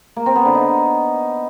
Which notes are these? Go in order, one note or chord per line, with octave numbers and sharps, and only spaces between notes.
A#3
C4
B3
D3
D#4